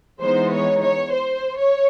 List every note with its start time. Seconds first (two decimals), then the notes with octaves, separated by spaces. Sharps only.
0.20 E3 G#3 B3 D#4 C5
0.51 C#5
0.81 C#5
1.12 C5
1.57 C#5